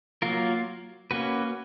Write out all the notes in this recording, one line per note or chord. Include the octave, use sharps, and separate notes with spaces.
F#3 A#3 F4 A#4
A#3 C#4 F#4 B4